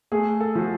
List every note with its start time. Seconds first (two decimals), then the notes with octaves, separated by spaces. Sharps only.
0.12 A3 G#4
0.40 A4
0.55 F3 F#4